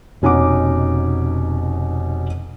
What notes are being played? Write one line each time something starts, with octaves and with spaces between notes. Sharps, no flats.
F1 B2 C#4 D#4 F#5 D6